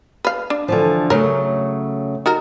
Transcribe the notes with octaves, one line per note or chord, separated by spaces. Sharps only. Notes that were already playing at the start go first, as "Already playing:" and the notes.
B4 F5
D4
D3 E3 F3
C#3 F#3 A3 A#4
D#4 F#4 A#4